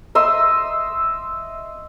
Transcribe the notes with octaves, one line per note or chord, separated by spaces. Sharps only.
D#5 E5 C6